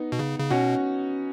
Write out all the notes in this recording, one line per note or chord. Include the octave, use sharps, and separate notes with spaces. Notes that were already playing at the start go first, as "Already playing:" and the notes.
Already playing: B3 D#4
B2
C#3
C#3
B2 C#4 F#4